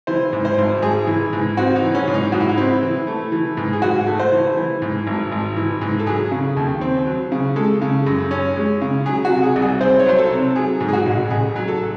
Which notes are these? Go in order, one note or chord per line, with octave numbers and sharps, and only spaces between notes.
E3 C5
G#2
C5
G#1
G#1 G#4
E3
G#2
C4 F#4
D#4
E3
C#4
G#2
D#4
G#2 F#4
E4
D#4
C4 E4
E3
A3
E3
G#2
G#4
G#2 F#4
A3
C5
E3
E3
G#2
G#1
G#1
E3
G#2
A4
F#3 G#4
C#3
D#2
C4
F#3
C#3
G#3 A4
C#3
F#2
C#4
G#3
C#3
F#3 G#4
F#4
C3
G#4
C2
G#4
C4 C5
C#5
F#3 C5
A4
C3
F#3 G#4
G#2
G#4
F#4
A1
A1 G#4
F#3
A4